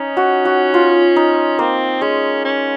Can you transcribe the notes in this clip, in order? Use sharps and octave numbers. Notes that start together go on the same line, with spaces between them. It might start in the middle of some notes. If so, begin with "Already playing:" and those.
Already playing: C#4 D#4
F#4
F#4
F4
D#4
A#3 C4
G#3 C#4
C#4